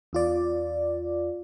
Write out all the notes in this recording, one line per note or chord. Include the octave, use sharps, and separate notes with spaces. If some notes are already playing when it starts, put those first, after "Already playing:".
E2 F4 D5